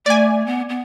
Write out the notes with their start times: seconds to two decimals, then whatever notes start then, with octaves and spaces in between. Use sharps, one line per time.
0.06 A3 D5 G#5
0.46 B3
0.69 B3